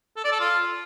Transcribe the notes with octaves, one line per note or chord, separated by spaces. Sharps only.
A4
D5
A4
F4